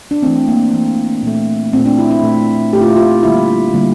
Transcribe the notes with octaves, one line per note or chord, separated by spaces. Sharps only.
D4
E3 A3 C4
A#3
E3 A3
A#2 A3
A#2 A3 C4
D4
E4
E4
A#2 A3
A#2 A3 G4
F4
E4
F4
D3 G3 A#3 E4
D3 G3 A#3